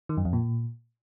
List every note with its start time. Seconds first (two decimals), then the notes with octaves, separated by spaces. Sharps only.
0.09 D#3
0.17 F#2
0.25 F2
0.33 A#2